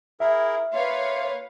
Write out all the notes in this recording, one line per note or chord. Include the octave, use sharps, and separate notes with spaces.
E4 G#4 A#4 E5
A#3 F4 B4 C#5 F5